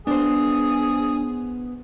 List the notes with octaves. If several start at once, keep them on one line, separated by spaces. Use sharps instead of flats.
B3 D4 G#4 C5